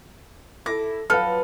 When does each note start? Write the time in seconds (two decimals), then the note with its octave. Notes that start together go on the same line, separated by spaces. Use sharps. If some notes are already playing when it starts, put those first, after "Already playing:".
0.66 E4 A4 D6 A#6
1.10 F3 F#3 A4 B4 F5 F6